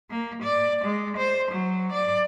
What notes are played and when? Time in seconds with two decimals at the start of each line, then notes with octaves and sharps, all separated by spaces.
0.10 A#3
0.43 D5
0.85 G#3
1.17 C5
1.52 F#3
1.92 D5